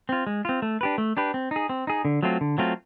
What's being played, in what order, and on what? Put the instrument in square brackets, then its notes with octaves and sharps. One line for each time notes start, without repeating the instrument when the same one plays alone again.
[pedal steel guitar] C4 F4
G#3
C4 F4
A3
D4 G4 B4
A3
D4 G4 B4
C4
D#4 G#4
C4
D#4 G#4
D3
F#3 A3 C4 F4
D3
F#3 A3 C4 F4